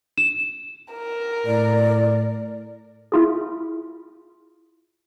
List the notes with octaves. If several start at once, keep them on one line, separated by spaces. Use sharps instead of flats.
E7
A#4
A2 D5
E4 F4 G#4